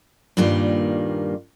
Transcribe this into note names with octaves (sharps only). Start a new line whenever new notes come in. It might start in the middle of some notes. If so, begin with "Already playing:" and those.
G2 A#2 D#3 G3 A#3 F4